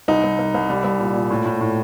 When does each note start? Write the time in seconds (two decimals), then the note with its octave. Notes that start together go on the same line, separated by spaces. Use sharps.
0.08 C2 D#4
0.23 C2
0.39 C2
0.54 C2
0.70 G3
0.84 C2
0.99 A#2
1.15 A#2
1.30 A2
1.45 A2
1.61 A2